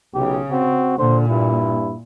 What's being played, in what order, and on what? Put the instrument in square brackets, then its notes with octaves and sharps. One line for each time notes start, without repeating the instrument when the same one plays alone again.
[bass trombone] B1 [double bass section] C#3 [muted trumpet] G4
[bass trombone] C4 [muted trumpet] F#4
[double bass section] A#2 [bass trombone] D3 [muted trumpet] C5
[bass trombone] G2 [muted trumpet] E4